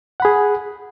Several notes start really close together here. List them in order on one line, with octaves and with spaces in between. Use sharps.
F#5 B5 G#4